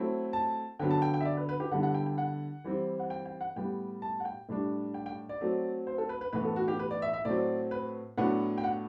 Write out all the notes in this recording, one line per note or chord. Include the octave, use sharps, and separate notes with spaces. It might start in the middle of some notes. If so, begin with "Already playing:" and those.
Already playing: F#3 A3 C4 E4
A5
D3 F#3 B3 G5
A5
G5
G5
E5
D5
B4
B4
G4
D3 G3 B3 E4 F#5
F#5
G5
G5
F#5
E3 G3 C4 E4
F#5
G5
G5
F#5
A2 G3 B3 G5
A5
F#5
G5
A2 G3 D4
G5
G5
D5
F#3 A3 C4
C5
A4
B4
B4
A2 E3 B3 B4
A4
F#4
G4
B4
D5
E5
E5
A2 F#3 C4 D5
B4
A2 F#3 B3 D4 F#5
G5
F#5